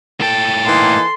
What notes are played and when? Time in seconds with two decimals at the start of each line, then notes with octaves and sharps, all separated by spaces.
0.20 A2 A4 G5
0.66 E3 A#3 D#4 C6